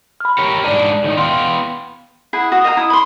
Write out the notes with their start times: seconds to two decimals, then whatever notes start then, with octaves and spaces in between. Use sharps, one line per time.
0.20 B5 F6
0.38 G4 A#4 C#5
0.65 G#2 D4 G#4 D5
1.04 A2 D#3 D#4
1.17 B3 F5 G5 C6
2.33 E4 G#4 F#5
2.52 F#4 D#6
2.64 D#5 F5 G5 A#5
2.77 E4 D#6
2.90 B5 C6